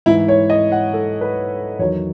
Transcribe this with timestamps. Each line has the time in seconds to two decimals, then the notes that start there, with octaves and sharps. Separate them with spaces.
0.06 G#2 E3 E4
0.28 C#5
0.50 D#5
0.72 F#5
0.93 A4
1.21 B4
1.79 E2 D#3 F#3 C#5